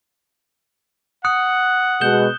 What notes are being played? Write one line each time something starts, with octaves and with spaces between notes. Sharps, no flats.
F#5 D#6 F#6 C#7
B2 G#3 G6 E7 G7